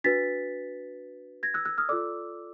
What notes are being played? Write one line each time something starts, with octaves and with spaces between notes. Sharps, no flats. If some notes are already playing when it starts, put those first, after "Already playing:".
D4 F#4 B4 A6 B6
G#6 A#6
E6 F#6
E6 F#6
D#6 F6
F4 A4 D5 D6 E6